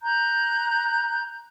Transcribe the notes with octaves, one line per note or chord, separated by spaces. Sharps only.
A#5 F#6 G6